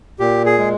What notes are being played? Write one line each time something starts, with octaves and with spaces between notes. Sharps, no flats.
A#2 G4
G#4
G#3